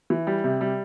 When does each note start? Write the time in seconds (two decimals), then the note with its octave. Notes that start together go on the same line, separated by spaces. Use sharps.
0.10 E3
0.27 G3
0.44 C3
0.61 G3